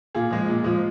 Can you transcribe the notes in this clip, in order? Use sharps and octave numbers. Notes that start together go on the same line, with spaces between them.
A#2 F4 G#4
F3 G#3
A#2
F3 G#3